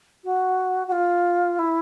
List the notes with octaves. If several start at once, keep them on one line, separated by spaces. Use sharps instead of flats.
F#4
F#4
F4
E4